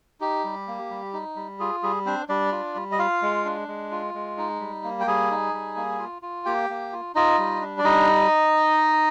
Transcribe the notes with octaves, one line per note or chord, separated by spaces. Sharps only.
D#4 G4
G3
A#3
G3
D#4
G3
F4 G#4
G3 G#4
C4 D4 C5
G3 D4 D5
F4
G3
D#5
F4 F5
G#3
D4
G#3
F4
G#3
D#4
G3
A#3
G5
G3 G#4 G#5
D#4
G3
A#3
F4
F4
A#3 G4 G5
A#3
F4
D#4 F4 D#5
G3
D4
D5
G3 D#4 D#5